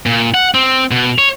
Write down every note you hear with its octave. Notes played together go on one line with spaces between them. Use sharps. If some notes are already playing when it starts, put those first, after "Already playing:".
A#2
F#5
C4
B2
C#5